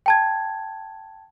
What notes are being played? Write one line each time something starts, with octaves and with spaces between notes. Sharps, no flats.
G5 A5 G#6